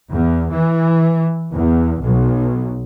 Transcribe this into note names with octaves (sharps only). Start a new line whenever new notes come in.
E2
E3
E2
B1